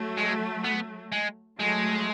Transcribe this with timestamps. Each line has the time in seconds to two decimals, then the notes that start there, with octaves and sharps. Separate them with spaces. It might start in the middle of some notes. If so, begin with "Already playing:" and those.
Already playing: F#3 A3
0.17 G#3
0.64 B3
1.12 G#3
1.59 F#3 G#3 A3